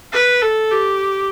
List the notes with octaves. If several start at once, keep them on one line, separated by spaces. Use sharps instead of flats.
B4
A4
G4